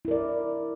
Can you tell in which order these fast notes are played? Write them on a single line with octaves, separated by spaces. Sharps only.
E4 A#4 D5